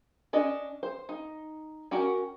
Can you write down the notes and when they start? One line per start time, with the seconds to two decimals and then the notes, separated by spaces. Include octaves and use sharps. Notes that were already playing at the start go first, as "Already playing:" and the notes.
0.33 C#4 D4 D5 D#5
0.83 C5
1.09 D#4
1.91 C#4 F#4 G4 A#4